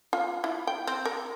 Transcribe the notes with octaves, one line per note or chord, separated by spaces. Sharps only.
F4
E4
G5
C4
A#4